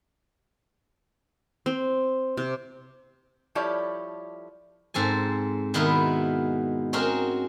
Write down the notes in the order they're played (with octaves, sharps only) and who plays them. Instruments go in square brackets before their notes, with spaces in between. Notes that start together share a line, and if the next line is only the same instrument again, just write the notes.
[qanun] C4
C3
[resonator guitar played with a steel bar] F3 G3 E4 A4 C#5 D5
[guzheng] G#2 C4 A4 G#5
B2 D#3 G#3 B3 E4 A#4
C4 C#4 D#4 F#4 G#4 A#4